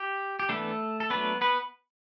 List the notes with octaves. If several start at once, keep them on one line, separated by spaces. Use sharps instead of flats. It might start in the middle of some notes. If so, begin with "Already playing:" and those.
Already playing: G4
G4
E3 A3 B3 D4 A4
A4
F#3 A3 B3 D4 B4
B3 B4